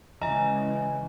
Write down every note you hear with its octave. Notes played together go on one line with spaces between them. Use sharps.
C#3 E3 G#3 D#5 G#5 A#5